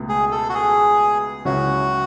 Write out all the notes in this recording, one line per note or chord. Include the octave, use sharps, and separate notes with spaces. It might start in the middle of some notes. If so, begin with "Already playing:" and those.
Already playing: C#2 B2 A3
G#4
A4
F#4
G#4
C#2 C#3 F#3 C#4 E4 F#4